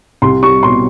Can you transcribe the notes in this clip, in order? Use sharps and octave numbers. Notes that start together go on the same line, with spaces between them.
C2 C6
G3 C#6
B2 C6